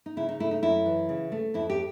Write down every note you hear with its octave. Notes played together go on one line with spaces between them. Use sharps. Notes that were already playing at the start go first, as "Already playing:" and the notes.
D#4
C#3 E4
D#4
A3 E4
D#4
F#2 E4
E3
C#3
A3
F2 E4
G4